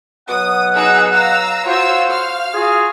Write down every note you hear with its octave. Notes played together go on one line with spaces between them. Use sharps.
B2 F#3 F#5 D#6
D#4 G#4 E6
F5 A#5 E6
F4 F#4 C5 C#5 E6
F5 F6
F4 F#4 G#4